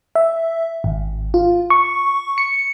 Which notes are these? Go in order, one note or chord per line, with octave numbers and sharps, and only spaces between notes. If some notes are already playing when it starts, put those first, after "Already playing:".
E5
G#1
F4
C#6
C#7